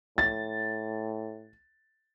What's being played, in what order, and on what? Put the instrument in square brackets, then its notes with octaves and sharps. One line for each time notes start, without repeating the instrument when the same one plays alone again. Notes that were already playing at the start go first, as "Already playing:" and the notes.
[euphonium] A2 [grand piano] A6